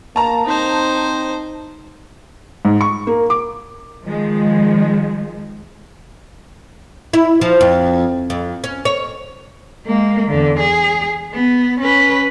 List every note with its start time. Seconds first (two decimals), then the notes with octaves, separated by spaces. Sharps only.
0.16 A#3 A5 A#5
0.46 C4 D#4 C5
2.65 G#2
2.81 C#6
3.07 A#3
3.30 D6
4.03 D#3 F3 G#3
7.13 E4
7.41 F3
7.61 F2
8.30 F2
8.64 C#4
8.85 C#5
9.86 G#3 A#3
10.27 E2 D3
10.59 G#4
11.33 B3
11.80 C#4 B4